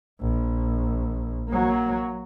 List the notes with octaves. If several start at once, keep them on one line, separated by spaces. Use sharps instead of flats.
A#1
F#3 A#3